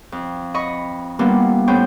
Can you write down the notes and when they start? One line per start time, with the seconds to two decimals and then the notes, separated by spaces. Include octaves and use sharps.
0.12 F2
0.54 D#5 B5 C#6
1.19 G3 A#3 B3 D4 E4 F4
1.68 A2 B3 C#4 C5 G5